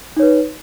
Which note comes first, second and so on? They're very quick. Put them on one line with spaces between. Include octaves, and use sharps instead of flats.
D#4 C#5 B4